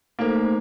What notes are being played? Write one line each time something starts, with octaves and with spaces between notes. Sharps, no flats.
A3 A#3 D#4 A4 C5